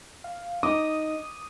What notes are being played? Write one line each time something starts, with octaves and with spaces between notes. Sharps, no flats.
F5
D#4 D6 D#6